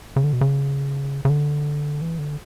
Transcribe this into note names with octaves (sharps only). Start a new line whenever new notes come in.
C#3
D3
B2
C#3
C#3
D3
E3
D3